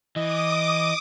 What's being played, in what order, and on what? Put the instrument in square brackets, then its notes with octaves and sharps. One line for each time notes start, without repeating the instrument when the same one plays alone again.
[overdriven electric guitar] E3 [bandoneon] D#5 [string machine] D6 D#6